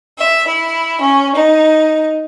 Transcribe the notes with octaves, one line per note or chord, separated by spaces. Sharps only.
E5
E4
C#4
D#4